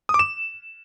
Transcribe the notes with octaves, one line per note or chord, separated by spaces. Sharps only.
D#6
D6
E7